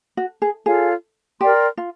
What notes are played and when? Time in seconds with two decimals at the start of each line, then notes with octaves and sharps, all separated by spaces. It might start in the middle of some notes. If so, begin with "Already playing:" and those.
0.17 F#4
0.42 G#4
0.66 F4 G#4 A4 C#5 F5
1.41 G4 A#4 D5 G5 C6
1.77 F4